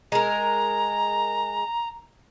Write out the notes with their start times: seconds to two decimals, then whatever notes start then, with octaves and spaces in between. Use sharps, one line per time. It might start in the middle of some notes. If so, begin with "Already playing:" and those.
0.12 G#3 A#4 A#5